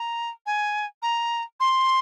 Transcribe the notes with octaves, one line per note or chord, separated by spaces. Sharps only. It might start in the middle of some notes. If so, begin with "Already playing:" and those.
Already playing: A#5
G#5
A#5
C6